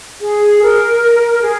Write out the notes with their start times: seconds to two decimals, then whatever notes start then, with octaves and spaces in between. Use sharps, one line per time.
0.21 G#4
0.61 A#4
1.41 G#4